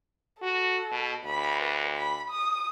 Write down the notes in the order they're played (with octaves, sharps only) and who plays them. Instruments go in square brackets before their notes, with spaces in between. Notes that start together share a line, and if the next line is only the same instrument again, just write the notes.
[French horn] F#4 [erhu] A4
[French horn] B2
[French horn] D2 [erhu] B5
[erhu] B4
B5
D#6